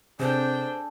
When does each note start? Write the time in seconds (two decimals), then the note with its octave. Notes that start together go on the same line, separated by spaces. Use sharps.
0.19 C3 D4 G#4 A4 C5 G5